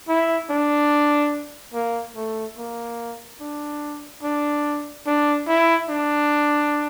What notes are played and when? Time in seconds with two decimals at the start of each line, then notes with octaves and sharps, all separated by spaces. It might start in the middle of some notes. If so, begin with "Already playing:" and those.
0.09 E4
0.50 D4
1.74 A#3
2.16 A3
2.58 A#3
3.41 D4
4.23 D4
5.07 D4
5.48 E4
5.89 D4